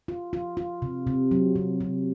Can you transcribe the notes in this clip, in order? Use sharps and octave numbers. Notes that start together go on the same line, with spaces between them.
F4
F4
F4
C3
C3
F#3
C3
C3